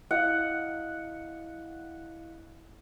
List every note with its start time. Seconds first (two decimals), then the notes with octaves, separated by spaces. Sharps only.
0.11 E4 D#5 F5 F#5